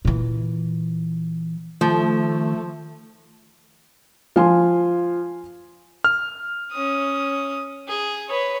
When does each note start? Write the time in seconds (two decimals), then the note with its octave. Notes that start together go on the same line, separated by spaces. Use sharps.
0.05 A#2 E3
1.81 D#3 F3 A3
4.36 F3 F5 G#5 C6
6.04 F6
6.72 C#4 D#6
7.88 G#4
8.28 B4 C#5